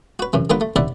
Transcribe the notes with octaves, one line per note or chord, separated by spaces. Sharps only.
F#4 B4
F#2 C3 E3
D3 G3 A#3 B3 F4 B4
A3
D#2 C3 E4 D5 E5 F#5